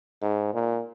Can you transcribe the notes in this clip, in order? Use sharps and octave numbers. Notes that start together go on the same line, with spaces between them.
G#2
A#2